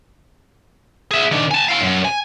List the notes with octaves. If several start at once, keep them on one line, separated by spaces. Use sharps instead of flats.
G#4 E5
D#3 D4
G#5 A5
E4 F5
F#2
G#5